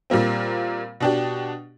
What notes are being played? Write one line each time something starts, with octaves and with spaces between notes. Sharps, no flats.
A#2 G3 A#3 C4
B2 D4 G4